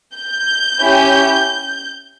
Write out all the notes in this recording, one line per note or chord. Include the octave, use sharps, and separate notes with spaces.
G6
C#4 E4 G4